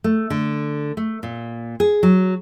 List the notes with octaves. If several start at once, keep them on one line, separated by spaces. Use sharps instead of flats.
A3
D3
A3
A#2
G#4
F#3